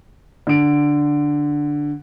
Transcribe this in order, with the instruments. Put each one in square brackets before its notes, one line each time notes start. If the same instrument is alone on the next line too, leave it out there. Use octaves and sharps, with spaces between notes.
[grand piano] D3 D7